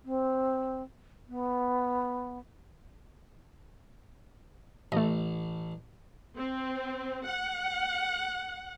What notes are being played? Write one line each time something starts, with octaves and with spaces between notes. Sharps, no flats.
C4
B3
A1 A3 D#5
C4
F#5